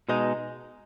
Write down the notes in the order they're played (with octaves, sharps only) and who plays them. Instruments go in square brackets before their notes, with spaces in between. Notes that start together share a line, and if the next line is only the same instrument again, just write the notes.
[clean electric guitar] B2 G#3 D#4 [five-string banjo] D#5